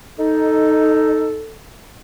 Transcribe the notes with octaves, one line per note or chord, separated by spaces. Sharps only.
D#4 A4